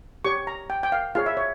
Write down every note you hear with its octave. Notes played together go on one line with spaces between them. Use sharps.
G4 C#5 C#6
A#5
G5
G5
F5
F4 G#4 C#5 F5
E5
C#5